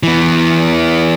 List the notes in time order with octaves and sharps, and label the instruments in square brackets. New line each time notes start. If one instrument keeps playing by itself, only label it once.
[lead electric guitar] E3 B3